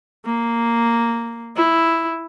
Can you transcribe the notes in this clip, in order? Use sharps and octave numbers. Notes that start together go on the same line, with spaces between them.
A#3
E4